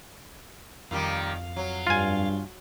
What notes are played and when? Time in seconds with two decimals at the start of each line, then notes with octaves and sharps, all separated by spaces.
0.91 F2 A#2 D#3 G3 F5
1.56 F#3
1.87 G2 F4 G#5